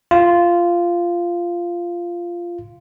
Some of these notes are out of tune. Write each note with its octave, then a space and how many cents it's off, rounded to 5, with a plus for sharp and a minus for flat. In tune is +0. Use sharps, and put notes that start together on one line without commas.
F4 -10